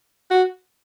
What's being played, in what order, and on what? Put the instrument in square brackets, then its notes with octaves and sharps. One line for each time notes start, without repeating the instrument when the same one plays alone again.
[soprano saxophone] F#4